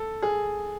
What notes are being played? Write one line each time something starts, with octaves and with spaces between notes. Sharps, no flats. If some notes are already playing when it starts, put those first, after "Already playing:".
Already playing: A4
G#4